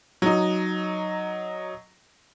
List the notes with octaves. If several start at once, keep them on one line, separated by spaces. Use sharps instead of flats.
F#3 D#4